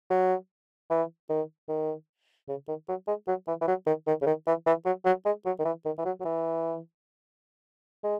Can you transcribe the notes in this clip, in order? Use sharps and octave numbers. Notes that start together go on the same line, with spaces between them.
F#3
E3
D#3
D#3
C#3
D#3
F#3
G#3
F#3
E3
E3
F#3
D#3
D#3
C#3
D#3
E3
E3
F#3
F#3
G#3
F#3
D#3
E3
D#3
E3
F#3
F#3
E3
G#3